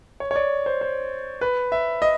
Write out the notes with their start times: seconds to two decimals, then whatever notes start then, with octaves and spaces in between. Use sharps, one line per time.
0.20 C#5
0.31 C#5
0.36 D5
0.66 C5
0.81 C5
1.41 B4
1.72 E5
2.02 D#5